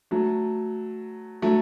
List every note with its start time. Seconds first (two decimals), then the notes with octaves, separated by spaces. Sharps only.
0.11 F#3 A3
1.42 F#3 A3